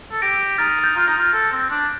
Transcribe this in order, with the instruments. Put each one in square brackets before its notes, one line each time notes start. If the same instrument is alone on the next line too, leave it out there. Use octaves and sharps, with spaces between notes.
[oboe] A4
[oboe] G4 [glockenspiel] A#6 D7
[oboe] D#4 [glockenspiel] F6 A6
[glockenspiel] A6
G6
[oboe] F4
[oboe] D#4 [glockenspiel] G6 A#6
[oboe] F4
A4
C4
D4